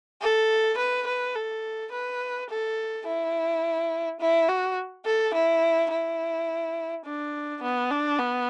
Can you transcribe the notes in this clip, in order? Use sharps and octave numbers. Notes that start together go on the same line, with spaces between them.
A4
B4
B4
A4
B4
A4
E4
E4
F#4
A4
E4
E4
D4
B3
D4
B3